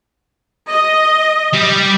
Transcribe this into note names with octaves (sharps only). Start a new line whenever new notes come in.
D#5
G3 G4